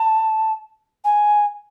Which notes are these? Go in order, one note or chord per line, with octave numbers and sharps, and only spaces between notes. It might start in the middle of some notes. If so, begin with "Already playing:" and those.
Already playing: A5
G#5